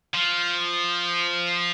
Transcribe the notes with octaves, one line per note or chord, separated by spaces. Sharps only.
F3